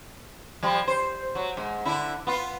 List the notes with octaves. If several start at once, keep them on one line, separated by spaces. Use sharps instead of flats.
F3 G3
C5
F#3
G#2
D3 E4
B3 F4